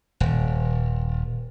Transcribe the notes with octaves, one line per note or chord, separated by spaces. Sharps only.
D#1